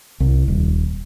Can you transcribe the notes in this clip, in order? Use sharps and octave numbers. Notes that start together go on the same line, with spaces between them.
C2
D#1